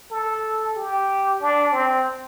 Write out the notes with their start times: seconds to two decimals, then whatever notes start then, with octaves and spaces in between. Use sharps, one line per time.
0.11 A4
0.76 G4
1.41 D4
1.72 C4